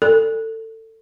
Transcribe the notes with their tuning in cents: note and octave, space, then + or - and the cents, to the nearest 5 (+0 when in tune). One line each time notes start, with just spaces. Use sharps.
A4 +25